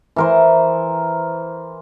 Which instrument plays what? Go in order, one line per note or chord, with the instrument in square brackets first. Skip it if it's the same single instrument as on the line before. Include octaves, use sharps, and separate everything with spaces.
[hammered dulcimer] E3 A#4 C5